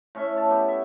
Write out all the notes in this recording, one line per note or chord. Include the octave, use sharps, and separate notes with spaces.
A2 C#4 E5
C#5 A5
B3 G4
E5